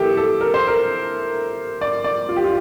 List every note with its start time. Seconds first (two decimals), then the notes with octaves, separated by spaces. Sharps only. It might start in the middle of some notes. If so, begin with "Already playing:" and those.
Already playing: E3 A#3 E4 G4 A4
0.17 A4
0.41 A#4
0.54 C5
0.68 A#4
1.81 D5
2.04 D5
2.29 F4
2.36 G4
2.44 F4